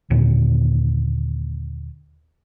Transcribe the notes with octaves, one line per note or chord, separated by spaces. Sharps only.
D#2 A#2 D3